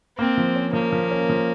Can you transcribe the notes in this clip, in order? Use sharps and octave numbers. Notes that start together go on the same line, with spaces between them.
A#3 C4
F3
C#4
F3 A#3
F3
C#4
F3